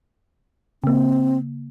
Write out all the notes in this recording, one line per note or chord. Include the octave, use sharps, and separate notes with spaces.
C#3 A#3 C4